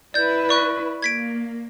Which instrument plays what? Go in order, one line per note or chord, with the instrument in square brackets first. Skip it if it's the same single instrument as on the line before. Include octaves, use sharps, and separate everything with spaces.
[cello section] E4 B4 [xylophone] D5 G6
[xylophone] D5 C#6 F#6
[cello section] A#3 [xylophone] G#6 B6 D7